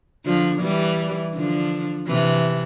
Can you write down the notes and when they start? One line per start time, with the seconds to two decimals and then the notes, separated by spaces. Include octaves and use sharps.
0.25 D3 F3
0.61 E3 G3
1.35 D3 F3
2.07 C3 E3